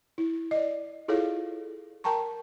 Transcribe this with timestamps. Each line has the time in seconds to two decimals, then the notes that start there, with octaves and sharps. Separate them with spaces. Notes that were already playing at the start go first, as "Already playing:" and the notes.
0.18 E4
0.51 D5 D#5
1.08 E4 F4 G#4 A4 C#5 F5
2.04 A#4 G5 A5 A#5 C#6